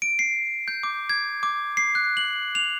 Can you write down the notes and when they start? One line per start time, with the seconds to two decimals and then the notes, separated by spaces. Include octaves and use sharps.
0.02 D7
0.19 C7
0.68 G6
0.83 D6
1.10 G#6
1.43 D6
1.77 C7
1.95 F#6
2.17 F#7
2.55 F7